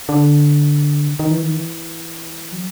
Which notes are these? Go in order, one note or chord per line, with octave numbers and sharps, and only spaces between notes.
D3
D#3
E3
D#3
E3
F#3